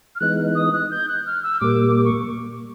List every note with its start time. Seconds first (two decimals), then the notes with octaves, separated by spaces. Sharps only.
0.15 F6
0.20 E3 G#3 B3 D#4 F#6
0.55 D#6
0.73 F#6
0.90 G6
1.08 F#6
1.26 F6
1.43 E6
1.61 A#2 G3 A#3 D6
1.96 D6
2.05 C#6